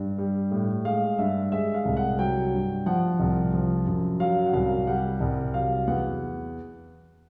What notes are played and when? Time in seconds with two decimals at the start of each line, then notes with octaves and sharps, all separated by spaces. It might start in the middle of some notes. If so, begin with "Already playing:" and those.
Already playing: G2
0.18 G3
0.51 A2
0.85 G#3 F5
1.18 G2 E5
1.52 G#3 E5
1.74 F5
1.85 C2
1.97 F#5
2.19 F#3 G5
2.53 G2
2.86 F3 F#5
3.20 C2
3.53 F3
3.86 F#2
4.20 F#3 F5
4.46 F#5
4.53 C2 F5
4.87 G3 F#5
5.20 C2
5.54 F#3 F5
5.87 E2 F#5